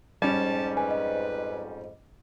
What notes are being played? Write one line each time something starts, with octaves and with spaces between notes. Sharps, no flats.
F2 G#2 G3 C#4 A5
B4 G#5
D#5